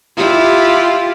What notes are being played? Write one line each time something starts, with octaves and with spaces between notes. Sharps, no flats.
E4 F4 G4